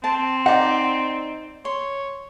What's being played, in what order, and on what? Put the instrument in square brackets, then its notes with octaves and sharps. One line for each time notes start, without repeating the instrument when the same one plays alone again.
[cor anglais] C4 [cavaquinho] A5
[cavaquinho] D#4 D5 [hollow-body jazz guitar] F#5
[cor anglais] C#5 [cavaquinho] C6